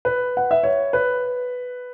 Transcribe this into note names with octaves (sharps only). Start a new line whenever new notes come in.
B4
F#5
E5
C#5
B4